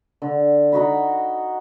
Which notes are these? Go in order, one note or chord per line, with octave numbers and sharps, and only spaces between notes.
D3
D#4 F#4 B5